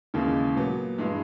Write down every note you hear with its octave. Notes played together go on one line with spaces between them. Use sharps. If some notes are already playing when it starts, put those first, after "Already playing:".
D#2 C#3 E3 G#3
A#2 F#3 B3
G2 E3 G#3